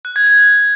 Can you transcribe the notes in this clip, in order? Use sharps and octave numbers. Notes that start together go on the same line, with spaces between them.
F#6
G#6
G#6